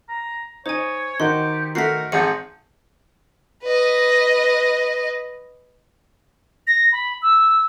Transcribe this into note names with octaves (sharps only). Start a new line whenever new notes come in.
A#5
D#4 C5 C#5 G#5
D#3 D#4 F#4 G4 C6
A3 F#4 A#4 B6 C7
G#1 G#4 C5 F#5 C#7
B4 D#5
A#6
B5
E6